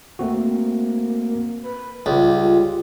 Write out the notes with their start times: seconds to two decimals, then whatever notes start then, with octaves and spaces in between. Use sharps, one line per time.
0.19 A3 A#3 C4 F#4
1.63 B4
2.06 C#2 G3 F4 G4